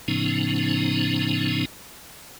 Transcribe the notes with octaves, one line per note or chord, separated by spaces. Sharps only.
A2 C#3 F3 B3 C#4 D#4